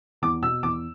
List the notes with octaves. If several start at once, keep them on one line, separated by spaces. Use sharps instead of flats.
E2 D6
B2 E6
E2 D6